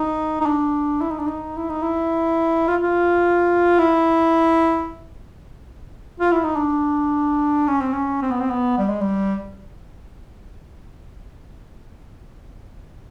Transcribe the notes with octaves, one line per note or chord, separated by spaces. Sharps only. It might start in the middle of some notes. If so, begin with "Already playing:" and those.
Already playing: D#4
D#4
D4
E4
D#4
D4
D#4
E4
D#4
E4
F4
F4
E4
F4
E4
D#4
D4
C#4
C4
C#4
C4
B3
C4
B3
G3
G#3
G3